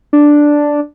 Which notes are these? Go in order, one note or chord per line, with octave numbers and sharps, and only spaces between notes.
D4